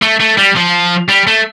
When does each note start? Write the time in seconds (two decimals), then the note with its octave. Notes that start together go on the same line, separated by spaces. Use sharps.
0.02 A3
0.20 A3
0.37 G3
0.56 F3
1.09 G3
1.27 A3